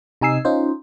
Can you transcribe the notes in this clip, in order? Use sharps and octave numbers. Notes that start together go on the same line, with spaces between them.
C3 D#4 G#5 E6 C7
C#4 D#4 F4 C5